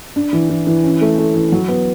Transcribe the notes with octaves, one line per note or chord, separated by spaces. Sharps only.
D4
E3
E3
E3
C#4
A3
A3
E3
F#3
B3